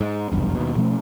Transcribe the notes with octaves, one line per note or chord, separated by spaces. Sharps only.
G#2
F1 B1 E2 G2
D#2 B2
B2 F3 A3 C#4